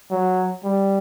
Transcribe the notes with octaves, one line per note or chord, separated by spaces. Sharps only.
F#3
G3